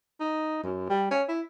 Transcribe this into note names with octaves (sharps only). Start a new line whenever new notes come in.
D#4
F#2
G3
C#4
E4